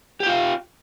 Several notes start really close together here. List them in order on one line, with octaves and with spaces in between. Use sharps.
G4 G5 F4 F5